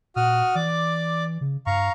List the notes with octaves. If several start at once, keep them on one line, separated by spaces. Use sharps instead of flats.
A#2 F#4 D#6 F6
E3 D5 D6
C#3
G2 F5 A#5 C#6